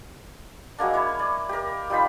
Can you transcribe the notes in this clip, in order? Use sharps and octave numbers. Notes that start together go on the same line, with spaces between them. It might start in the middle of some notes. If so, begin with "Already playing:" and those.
F#3 G#3 A#3 D4
E4 C#5
D5
G4 A#4
G3 D#4 F4 B5